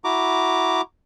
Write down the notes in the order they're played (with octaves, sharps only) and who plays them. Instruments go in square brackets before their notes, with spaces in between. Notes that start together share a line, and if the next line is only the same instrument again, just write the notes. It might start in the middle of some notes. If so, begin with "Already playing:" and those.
[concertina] E4 F#4 A#5 D6